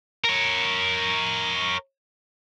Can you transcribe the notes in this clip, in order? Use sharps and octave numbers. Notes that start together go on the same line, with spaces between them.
A#4 C#5